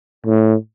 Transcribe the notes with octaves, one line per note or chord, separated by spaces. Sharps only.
A2